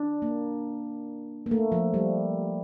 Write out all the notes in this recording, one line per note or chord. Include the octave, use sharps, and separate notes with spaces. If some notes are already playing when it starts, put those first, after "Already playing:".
Already playing: D4
A#3
A#3
A3
F3
G3